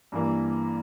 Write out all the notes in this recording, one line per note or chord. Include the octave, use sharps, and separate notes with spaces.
G2 E3 A#3